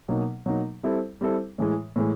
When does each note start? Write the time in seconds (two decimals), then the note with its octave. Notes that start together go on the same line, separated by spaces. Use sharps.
0.08 B2 F#3 A#3 D#4
0.46 B2 F#3 A#3 D#4
0.83 G3 C4 E4 A4
1.21 G3 C4 E4 A4
1.58 A2 E3 G#3
1.96 A2 E3 G#3